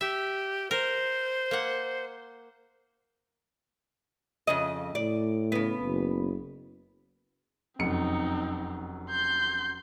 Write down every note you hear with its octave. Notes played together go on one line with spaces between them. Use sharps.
G4 E5
A#4 C5
A#3 F#5
F2 C#3 D#5
A2 D5
C#3 B3
F#1
F1 F#2 C4 D#4 C#7
C6 G6